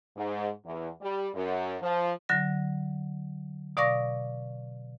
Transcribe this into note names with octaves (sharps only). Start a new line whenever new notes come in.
G#2
E2
G3
F#2
F3
D3 F#3 A#6
B2 D5 F5 C#6 D6 A#6